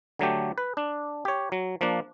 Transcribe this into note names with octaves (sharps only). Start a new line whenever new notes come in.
D3 F#3 A3 G4
B4
D4
G4 C#5
F#3
F3 A#3 D4